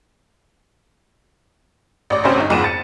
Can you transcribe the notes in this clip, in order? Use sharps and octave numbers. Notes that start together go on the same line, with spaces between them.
A1 D5
A1 D2 C3 C4 C#4 C5
G1 D#4
F#1 F2 G#2 B3 D#7 E7
A6 C#7